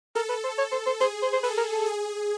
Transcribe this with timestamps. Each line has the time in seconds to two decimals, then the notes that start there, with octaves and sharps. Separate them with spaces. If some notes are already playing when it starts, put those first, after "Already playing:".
0.15 A4 A#4
0.29 B4
0.44 C5
0.58 C#5
0.72 C5
0.86 C5
1.00 G#4 C5
1.23 C5
1.33 C5
1.43 A4 B4
1.57 A#4
1.72 A4
1.86 G#4